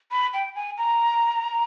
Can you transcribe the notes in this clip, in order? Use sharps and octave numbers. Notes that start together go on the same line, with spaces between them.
B5
G5
G#5
A#5